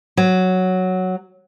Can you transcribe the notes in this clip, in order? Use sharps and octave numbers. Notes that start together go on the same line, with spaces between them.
F#3